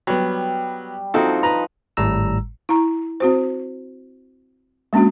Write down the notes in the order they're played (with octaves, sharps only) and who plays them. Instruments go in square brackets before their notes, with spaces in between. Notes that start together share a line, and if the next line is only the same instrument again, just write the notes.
[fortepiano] F#3 B3 [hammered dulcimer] G3
[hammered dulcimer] F3 D#4 [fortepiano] C4 F#4 A4
[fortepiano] B4 A#5
[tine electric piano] G#1 A2 G3 A#5 E6
[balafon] E4 A#5
C4 F#4 C5
G#3 A#3 C#4 D4 F#4